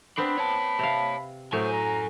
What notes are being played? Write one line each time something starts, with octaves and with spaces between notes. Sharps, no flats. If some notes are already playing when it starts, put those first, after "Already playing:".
B3 C4 D4 B5
C#5 A5
C3 F5
F#2 A2 F#3 C5 G#5
A#5